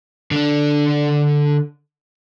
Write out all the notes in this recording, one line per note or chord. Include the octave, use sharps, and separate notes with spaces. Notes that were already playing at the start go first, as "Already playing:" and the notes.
D3 D4